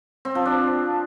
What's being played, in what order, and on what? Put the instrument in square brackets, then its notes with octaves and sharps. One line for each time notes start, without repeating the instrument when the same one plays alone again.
[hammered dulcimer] C4
F3
D4